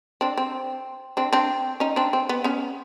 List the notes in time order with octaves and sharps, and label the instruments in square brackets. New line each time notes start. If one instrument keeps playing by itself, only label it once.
[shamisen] C4 D4
C4
C4 D4
C4 D4
C#4 D#4
C4 D4
C4
B3
B3 C#4